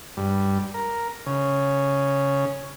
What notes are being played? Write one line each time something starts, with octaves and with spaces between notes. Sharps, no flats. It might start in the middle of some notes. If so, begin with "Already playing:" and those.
G2
A#4
C#3